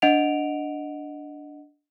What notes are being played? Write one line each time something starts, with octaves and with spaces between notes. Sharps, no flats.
D4 D#5 F#5 D7 F7